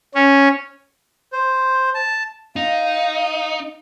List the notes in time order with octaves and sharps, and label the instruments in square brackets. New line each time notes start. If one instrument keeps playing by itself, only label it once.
[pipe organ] C#4
[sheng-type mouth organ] C5
A5
[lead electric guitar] D#4 [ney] F5